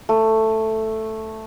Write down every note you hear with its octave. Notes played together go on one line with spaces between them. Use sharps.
A3